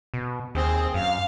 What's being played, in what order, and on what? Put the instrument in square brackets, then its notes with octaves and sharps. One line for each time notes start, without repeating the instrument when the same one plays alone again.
[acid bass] B2
[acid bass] D#2 [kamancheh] C4 G#4
[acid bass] F#2 [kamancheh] F5